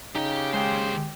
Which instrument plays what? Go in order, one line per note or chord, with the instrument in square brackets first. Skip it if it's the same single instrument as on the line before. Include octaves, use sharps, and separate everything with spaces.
[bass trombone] C#3 [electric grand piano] D#4 [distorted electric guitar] G4 G5
[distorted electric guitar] D#2 C5 [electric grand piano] G#3 [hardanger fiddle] G4